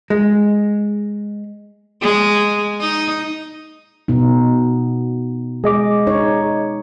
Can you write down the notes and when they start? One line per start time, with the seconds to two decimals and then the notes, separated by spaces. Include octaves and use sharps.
0.10 G#3
2.01 G#3
2.81 D#4
4.08 B2 B3 D#4
5.64 G#3 G#4 D#5 D6
6.07 D#4 C#5